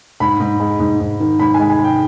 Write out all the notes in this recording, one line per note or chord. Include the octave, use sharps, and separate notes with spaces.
G#2 B5
G#2
G#3
G#2
G#2
D#3
G#2 B5
G#5
G#3
G#5
G#3 G5